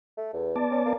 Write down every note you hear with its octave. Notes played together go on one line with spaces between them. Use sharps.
A3
E2
B3 D5 A5
C#4
A#3